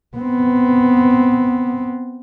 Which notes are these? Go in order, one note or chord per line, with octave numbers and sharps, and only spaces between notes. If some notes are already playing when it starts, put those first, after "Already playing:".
B3 C4